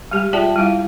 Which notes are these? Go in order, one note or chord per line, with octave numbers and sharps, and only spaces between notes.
G3 G#3 G4
F4 G#4 D5 E5 G5 A5
G3 E4 F5